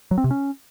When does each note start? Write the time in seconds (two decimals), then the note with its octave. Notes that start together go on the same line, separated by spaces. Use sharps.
0.11 F#3
0.18 C4
0.24 C3
0.31 C#4